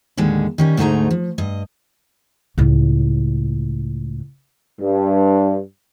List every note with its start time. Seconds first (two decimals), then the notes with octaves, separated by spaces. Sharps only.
0.17 D#2 A2 D3 G#3
0.58 D#3 G3 C#4
0.77 D2 G#2 A3 D#4 G#4 A#5
1.11 F3
1.38 G2 D#5
2.58 C#2 A2
4.80 G2